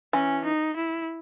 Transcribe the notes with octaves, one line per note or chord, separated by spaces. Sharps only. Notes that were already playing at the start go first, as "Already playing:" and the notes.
E3 C#4
D#4
E4